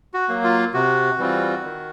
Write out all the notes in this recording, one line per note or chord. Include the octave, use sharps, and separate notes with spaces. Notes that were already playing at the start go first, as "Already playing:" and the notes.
F#4
F#3 A#3
F4
C3 F#4
E3 G3 C4 F4
D#3